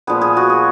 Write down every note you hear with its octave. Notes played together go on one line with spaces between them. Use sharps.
A#2 F3 B3 G#4
G#4
F#4
G#4